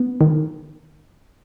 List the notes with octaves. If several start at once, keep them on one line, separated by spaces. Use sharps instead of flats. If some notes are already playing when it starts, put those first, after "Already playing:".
Already playing: B3
D#3